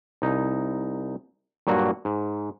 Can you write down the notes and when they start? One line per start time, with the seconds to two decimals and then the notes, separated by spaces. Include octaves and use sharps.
0.22 C2 D#4
1.67 G2 A#2 F#3 A#3 F#4
2.05 G#2